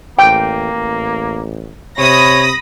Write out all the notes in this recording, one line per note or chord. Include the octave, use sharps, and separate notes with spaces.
A1 A#3 G5
A1
C3 C#5 B5 D#6 A#6